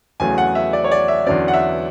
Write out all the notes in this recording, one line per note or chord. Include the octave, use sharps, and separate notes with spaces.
E2 C#3 F#3 A3 G#5
F#5
E5
D5
C#5
D5
E5
E2 D3 F#3 C#4 D5
F#5
E5